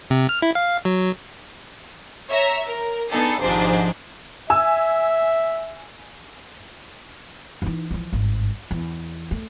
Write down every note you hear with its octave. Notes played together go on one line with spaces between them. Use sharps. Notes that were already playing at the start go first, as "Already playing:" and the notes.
C3
F6
E4
F5
F#3
C#5 E5 A#5
A#4
B3 D4 D#4 G#4 A4
G#1 G#2 C3 F3 D4 C5
E5 G#5 E6
E3 D#4
E3 F3
G#1 G2
E2
A3